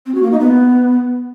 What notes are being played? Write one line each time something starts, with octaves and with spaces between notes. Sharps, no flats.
C4
F#4
A#3
D#4
B3